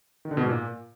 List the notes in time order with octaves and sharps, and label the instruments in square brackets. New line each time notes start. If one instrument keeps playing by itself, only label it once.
[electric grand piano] D#3
D3
B2
G#2
A#2